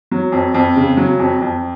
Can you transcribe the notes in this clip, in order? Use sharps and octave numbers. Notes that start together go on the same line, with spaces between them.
F#3
F2
F2
C#3
F#3
F2
F2